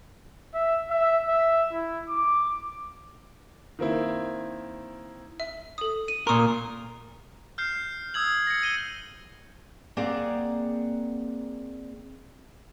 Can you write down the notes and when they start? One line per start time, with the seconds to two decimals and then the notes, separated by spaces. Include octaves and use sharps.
0.54 E5
0.91 E5
1.28 E5
1.72 E4
2.09 D6
3.79 D#3 A#3 C4 E4
5.40 E5
5.78 A4 D#6
6.08 D#7
6.27 A#2 A#4 C6 C#6 D#6
7.58 F6 G6 C7
8.14 D#6 E6 G#6 F#7
8.47 A#6 C#7
8.63 D#7 G7
9.97 A#3 C4 G#4 D5 F#5 A#5